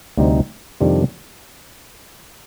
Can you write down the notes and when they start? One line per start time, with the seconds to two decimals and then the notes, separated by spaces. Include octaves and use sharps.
0.17 D2 C3 G3 C4 D#4
0.81 F2 C3 D#3 G3 D4